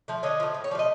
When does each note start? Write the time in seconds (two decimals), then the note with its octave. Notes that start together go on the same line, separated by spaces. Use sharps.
0.08 F3 A3
0.23 D3 C#5 D#5
0.40 F3 A3
0.54 A2
0.64 C#5
0.71 F3 D5
0.75 A3 D#5